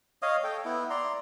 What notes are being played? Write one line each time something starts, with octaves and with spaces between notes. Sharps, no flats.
C#5 D#5 F5 D#6
A4 G5
B3 E4
D5 A#5 C6